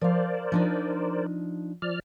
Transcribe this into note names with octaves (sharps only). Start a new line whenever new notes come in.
F3 A#4 C5 D5 F5
F3 D4 D#4
F3 D5 F6